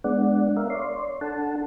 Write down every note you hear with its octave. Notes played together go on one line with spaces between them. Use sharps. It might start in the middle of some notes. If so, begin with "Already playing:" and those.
G#3 B3 D4 D5 F#5
A#4 E5 F5
C#5 D5 C6
D4 A4 F#5 A5